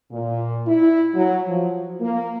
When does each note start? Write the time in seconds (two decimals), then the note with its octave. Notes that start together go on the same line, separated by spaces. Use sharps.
0.12 A#2
0.66 E4
1.14 F#3
1.47 F3
2.00 A#3